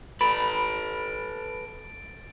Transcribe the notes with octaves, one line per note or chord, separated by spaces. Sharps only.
A4 B4 B5 A6 D7